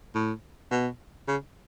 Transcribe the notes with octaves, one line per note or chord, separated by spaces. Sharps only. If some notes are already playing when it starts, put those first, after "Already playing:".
A2
B2
C#3